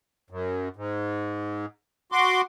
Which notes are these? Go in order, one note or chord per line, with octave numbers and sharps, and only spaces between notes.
F#2
G#2
F#4 C6 D6